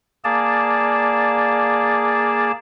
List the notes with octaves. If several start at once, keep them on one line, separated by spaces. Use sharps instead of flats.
A#3 G#4 D5 A5